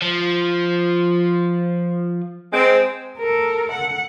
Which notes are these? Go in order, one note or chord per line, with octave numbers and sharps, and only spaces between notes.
F3
G#3 C4
A4 A#4
F#5